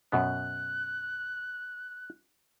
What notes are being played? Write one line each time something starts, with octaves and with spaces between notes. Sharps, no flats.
F#2 B2 B3 F#6